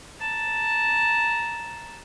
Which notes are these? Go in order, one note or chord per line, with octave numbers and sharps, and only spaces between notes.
A5 A#5